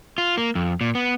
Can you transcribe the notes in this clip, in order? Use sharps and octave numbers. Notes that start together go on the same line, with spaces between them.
F4
A#3
F2
A#2
B3